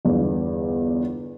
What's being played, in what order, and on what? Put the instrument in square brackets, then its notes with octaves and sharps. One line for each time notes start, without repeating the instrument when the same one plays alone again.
[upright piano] G1 E2